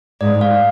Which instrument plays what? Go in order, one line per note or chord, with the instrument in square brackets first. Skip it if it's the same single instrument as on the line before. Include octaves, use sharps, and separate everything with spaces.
[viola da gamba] G#2 [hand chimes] D5
[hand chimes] F5